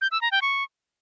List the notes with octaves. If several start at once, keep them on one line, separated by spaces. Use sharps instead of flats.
G6
E6
A#5
G5
C#6